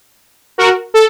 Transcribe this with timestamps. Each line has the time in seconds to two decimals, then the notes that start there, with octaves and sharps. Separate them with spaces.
0.58 F#4 A#4
0.94 A4